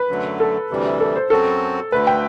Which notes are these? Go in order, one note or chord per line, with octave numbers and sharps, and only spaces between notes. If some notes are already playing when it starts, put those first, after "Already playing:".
Already playing: B4
F#2 D3 F#3 A3
A4
D2 C3 E3 G3
A4
C5
F#2 F#3 C4 F#4 A4
D2 D3 A3 B4
G5